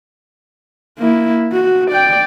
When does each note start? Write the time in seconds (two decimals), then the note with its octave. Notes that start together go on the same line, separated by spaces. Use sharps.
0.98 A#3 E4
1.53 F#4
1.91 D5 G5